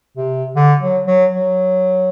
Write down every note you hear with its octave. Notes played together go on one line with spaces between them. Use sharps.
C3
D3
F#3
F#3
F#3